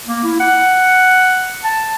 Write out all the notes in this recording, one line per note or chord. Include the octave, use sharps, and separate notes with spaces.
A#3
E4
F#5
A5